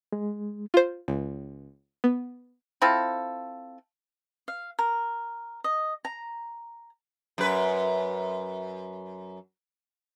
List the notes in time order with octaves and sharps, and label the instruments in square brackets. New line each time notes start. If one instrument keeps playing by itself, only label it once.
[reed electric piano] G#3
[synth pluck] F4 C5
C#2
B3
[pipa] C4 E4 F4 A4
[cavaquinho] F5
A#4
D#5
A#5
[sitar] F#2 B4